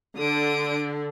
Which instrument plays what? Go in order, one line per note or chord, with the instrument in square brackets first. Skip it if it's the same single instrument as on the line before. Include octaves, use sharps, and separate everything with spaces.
[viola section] D3 [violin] D#6 D7